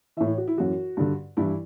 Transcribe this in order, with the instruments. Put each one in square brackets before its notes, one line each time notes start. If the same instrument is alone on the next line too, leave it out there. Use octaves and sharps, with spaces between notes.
[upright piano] E3 E5
A2
C#5
F#4
E4
F#2 E3 F#4
G2 D3
G2 E3 E4